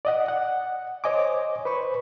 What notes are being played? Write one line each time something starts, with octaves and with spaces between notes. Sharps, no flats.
D5 D#5 F#5
F#5
C5 C#5 D#5 G#5 D6
B4 C5 B5 C#6